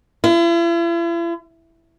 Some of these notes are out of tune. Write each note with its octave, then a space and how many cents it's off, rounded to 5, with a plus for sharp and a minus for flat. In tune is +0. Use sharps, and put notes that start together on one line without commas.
E4 +45